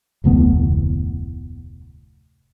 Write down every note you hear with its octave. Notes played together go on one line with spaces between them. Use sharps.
F1 D2 A2 B3